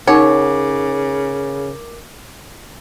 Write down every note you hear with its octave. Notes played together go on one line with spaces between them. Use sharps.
C#3 D#4 A#4 C#5 F#5 D6